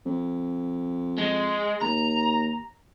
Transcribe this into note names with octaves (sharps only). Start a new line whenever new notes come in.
F2
G#3
D#2 A#5